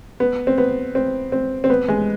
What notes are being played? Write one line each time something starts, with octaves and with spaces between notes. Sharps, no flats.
B3
C4
B3
C4
C4
C4
B3
G#3